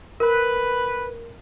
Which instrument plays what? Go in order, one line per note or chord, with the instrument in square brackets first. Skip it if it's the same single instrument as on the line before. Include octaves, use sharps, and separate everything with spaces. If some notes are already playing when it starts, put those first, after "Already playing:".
[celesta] A#4 [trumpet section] B4